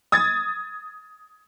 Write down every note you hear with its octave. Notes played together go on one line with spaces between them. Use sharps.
D#6 G#6 A6